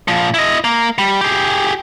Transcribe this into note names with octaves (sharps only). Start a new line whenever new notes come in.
A#2 F3
E4 D#5
A#3
G3
G4 G#4